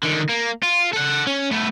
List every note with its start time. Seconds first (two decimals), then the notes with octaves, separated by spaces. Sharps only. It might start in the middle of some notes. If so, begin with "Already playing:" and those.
0.03 D3 D#3
0.30 A#3
0.63 F4
0.93 A4 F#5
1.27 C#4
1.51 A3 B3